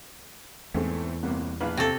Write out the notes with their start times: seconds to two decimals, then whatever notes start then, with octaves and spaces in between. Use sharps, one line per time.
0.74 E2 G#2 A3 C4 G#4
1.23 G1 C3 A#3 B3
1.61 A#1 E3 B4 F5 F6
1.77 C3 C4 A4 A5 C#6